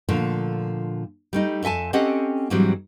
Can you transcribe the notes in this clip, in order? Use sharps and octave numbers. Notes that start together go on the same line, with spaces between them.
A#2 D3 F3 A3
G3 A3 D#4
F2 A4 E5 G#5 A5
C4 C#4 G4 A4 D#5 F#5
G#2 E3 F#3 G3 C4 D4